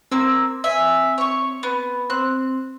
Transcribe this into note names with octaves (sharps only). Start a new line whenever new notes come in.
A#3 C4 E6
E5 G#5
C#5 C#6
B3
C4 F#6